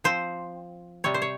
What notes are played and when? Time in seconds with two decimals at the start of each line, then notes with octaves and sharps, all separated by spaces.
0.04 F3 C4 C5
1.04 C3 G3 C4 C#5
1.14 C5
1.22 C#5